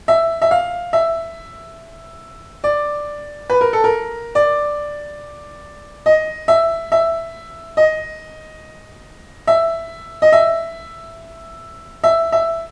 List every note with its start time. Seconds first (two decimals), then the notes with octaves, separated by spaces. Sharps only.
0.08 E5
0.42 E5
0.51 F5
0.93 E5
2.64 D5
3.50 B4
3.61 A#4
3.73 A4
3.84 A#4
4.35 D5
6.06 D#5
6.48 E5
6.92 E5
7.77 D#5
9.47 E5
10.22 D#5
10.32 E5
12.04 E5
12.32 E5